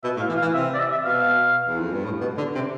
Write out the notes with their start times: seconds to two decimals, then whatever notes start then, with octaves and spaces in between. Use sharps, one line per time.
0.04 B2 E5
0.16 A2
0.20 F5
0.29 E3
0.37 F5
0.42 E3
0.54 C3 E5
0.74 D5
0.79 E5
0.92 E5
1.04 B2 F5
1.67 E2
1.80 F2
1.92 G2
2.05 A2
2.21 B2
2.38 D3
2.55 C3